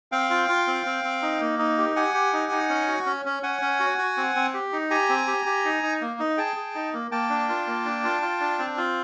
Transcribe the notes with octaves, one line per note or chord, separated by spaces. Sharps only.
C4 F5 G5
F4
F4
C4
C4
C4
D#4
A#3
D#4
G4
G4 F#5 G#5
G4
D#4
D#4
C#4
F#4
C#4
C#4
C#4 F#5 G#5
C#4
F#4
F#4
C4
C4
G4
D#4
G4 G#5 A#5
C4
G4
G4
D#4
D#4
A#3
D#4
G#4 G5 A5
G#4
D#4
A#3
A#3 G5 A5
D4
F4
A#3
D4
F4
F4
D4
C4
F4